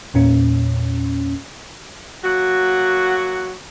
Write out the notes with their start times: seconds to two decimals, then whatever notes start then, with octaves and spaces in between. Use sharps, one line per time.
0.14 E2 A#2 C#4
2.24 F#3 A#3 F#4